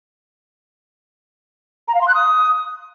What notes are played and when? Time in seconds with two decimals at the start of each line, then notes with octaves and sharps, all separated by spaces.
1.88 A#5
1.95 F5
2.01 C6
2.08 F#6
2.14 D#6